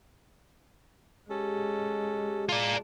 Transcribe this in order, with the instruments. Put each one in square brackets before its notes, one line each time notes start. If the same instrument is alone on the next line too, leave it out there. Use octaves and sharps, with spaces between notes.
[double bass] G#3 [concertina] C#4 A4 [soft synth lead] G4
[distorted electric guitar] F4 D5 [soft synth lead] A5